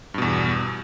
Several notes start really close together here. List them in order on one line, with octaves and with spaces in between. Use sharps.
G2 B2 E2